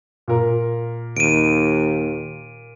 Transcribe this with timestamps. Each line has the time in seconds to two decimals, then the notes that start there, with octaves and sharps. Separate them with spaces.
0.28 A#2 A#4
1.17 D#2 D7 D#7